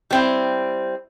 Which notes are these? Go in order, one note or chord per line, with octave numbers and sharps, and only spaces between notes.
G3 C4 E4